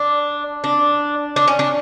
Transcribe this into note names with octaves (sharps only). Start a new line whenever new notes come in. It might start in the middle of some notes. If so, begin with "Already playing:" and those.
Already playing: D4
D4
D4
C#4
D4